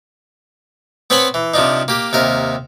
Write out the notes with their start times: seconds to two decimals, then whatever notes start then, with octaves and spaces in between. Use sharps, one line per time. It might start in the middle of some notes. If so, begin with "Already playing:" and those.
1.10 B3 C4 B4 C#5 G#5 B5
1.34 E3
1.54 C3 F3 D4 D#4
1.88 A#3 G4
2.13 D#2 C3 A#4